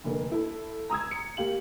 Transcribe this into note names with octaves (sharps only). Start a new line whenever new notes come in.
F1 D3 A#3
E4 A4
A#5 D#6 E6 G#6
C#7
A#3 G4 F5 F#7